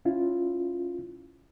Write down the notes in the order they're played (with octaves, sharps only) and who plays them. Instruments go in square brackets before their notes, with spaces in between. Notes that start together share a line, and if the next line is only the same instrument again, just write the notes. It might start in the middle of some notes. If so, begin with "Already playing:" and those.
[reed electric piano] C#4 E4 F4